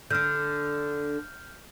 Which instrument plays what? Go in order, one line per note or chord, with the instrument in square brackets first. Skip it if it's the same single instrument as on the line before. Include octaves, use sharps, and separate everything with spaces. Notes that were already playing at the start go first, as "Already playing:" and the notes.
[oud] D3 D4 [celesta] F6 G6